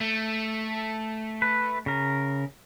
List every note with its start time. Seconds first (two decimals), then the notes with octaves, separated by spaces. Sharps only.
0.01 A3
1.42 B4
1.86 C#3 A#4